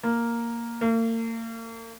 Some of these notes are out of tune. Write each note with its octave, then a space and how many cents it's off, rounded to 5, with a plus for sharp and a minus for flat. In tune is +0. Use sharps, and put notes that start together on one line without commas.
A#3 +0
A#3 -40